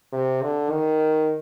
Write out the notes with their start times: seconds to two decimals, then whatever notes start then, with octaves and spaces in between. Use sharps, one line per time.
0.13 C3
0.42 D3
0.71 D#3